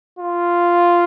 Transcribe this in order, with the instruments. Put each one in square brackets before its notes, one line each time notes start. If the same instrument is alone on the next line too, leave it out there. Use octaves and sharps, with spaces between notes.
[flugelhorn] F4